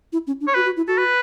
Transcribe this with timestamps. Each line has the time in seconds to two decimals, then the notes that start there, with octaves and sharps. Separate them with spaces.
0.13 E4
0.27 C#4
0.41 D4
0.47 C#5
0.54 F#4 B4
0.66 F#4
0.77 E4
0.87 F#4 A4
0.98 B4